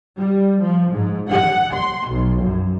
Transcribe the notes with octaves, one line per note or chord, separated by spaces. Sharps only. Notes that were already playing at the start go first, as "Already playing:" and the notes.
G3
F3
G#2
F#5
C6
B1
F#2